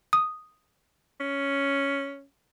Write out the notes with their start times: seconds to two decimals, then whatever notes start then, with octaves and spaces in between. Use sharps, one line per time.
0.13 D#6
1.20 C#4